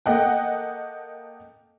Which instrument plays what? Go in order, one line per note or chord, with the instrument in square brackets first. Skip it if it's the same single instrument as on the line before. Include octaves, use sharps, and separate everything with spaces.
[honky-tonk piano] A#3 A4 D#5 F#5 G5